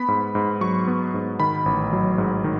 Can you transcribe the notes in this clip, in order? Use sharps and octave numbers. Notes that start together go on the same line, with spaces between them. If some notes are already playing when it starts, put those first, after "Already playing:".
Already playing: B3 B5
G#2
G#2
F#3 C#6
B3
G#2
D#3 B5
A1
F#3
G#2
D#3